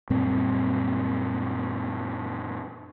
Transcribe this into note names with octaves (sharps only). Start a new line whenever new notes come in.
F#2 A#2 G3 C4